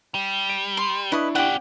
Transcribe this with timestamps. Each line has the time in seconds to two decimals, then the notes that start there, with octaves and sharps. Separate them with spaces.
0.15 G3
0.50 D7
0.77 C6
1.12 D4 E4 B4 D#5 C#6
1.35 C#4 G4 D5 F#5